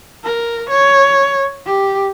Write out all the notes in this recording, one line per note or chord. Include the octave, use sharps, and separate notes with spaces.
A#4
C#5
G4